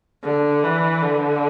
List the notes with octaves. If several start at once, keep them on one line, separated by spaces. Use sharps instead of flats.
D3
E3
D3